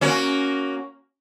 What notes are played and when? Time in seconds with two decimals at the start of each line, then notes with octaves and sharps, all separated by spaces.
0.01 A#3 C#4 F#4